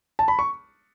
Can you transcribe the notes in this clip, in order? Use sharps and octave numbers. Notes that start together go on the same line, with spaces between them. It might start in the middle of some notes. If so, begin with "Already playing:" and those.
A5
B5
C#6